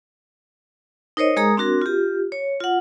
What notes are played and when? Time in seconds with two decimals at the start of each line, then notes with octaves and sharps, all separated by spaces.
1.17 D#4 A#4 C5 C#5 D#5
1.37 G#3 G#4 A#4 A#5 D#6
1.57 C4 D4 F#4 A#4
1.82 F4 G4
2.32 C#5
2.60 F4 F#5